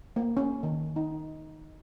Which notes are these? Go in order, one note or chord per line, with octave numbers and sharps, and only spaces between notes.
A#3
C#4
D#3
D#4